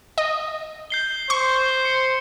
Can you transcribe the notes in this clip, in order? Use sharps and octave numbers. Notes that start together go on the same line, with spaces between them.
D#5
G6 C7 G7
C5 C#6
C#7